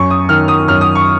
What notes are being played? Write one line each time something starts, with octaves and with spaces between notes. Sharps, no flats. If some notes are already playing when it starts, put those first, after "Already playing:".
Already playing: F#2 C#6
D#6
D#3 F6
D#6
F#2 F6
D#6
C#6